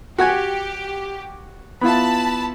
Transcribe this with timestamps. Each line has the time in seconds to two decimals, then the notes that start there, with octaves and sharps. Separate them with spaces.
0.18 F#4 G4 F#5 G#5
1.81 B3 E4 F4 A5 B5